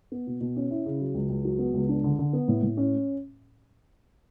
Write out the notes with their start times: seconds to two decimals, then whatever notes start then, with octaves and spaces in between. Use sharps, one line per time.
0.12 B3
0.27 B2
0.41 B2
0.56 C#4
0.71 E4
0.86 C#3
1.01 F#3
1.14 C#2
1.29 C#2
1.45 F#3
1.59 B3
1.74 C#2
1.89 D4
2.04 D3
2.19 D3
2.33 B3
2.48 A2
2.63 A2
2.77 C#4